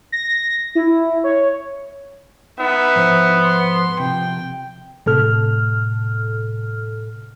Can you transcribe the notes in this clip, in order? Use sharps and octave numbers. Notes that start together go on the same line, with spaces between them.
A#6
E4
C#5
B3 D#4 E5
G#2 F3 C5
C6
C3 F3 G5
A2 C3 A4 F6